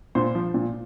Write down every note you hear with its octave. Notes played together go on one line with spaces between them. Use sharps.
A#2 C5
F3
A#2